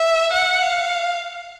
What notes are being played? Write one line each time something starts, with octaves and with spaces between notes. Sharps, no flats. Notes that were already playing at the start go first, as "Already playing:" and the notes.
Already playing: E5
F#5
F5